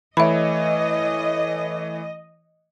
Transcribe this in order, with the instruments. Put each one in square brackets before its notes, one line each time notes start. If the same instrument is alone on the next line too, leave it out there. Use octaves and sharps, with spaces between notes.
[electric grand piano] E3 A3 C#5 [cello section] D#5 [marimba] E5 B5